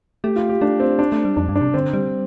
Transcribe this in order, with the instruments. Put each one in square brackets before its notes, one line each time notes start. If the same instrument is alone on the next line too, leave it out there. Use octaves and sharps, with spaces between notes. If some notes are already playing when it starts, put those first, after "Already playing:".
[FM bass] A3 [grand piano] G4
[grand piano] F4
G4
[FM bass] A3 [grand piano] D4
[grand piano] C4
D4
[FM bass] A3
G3
[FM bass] F2 [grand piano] D4
[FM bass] G2
[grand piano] D4
[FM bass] C3
[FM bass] D3 [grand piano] C4
[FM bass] G3